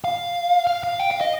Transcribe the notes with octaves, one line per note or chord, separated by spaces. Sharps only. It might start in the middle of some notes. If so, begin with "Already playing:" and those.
F5
F5
F5
G5
F5
D#5